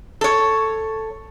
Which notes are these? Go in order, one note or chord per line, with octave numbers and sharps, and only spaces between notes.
A4 C#5